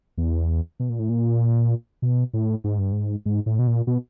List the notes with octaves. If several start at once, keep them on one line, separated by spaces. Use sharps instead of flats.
E2
B2
A#2
A2
A#2
B2
A2
G#2
G2
G#2
G#2
A2
B2
A#2
B2